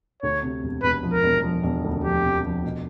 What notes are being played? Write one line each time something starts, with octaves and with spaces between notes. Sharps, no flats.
D2 C#5
C3
E1
E1 B4
F3
A#4
E1
F3
E1
D2
F3 G4
C3
F3
B2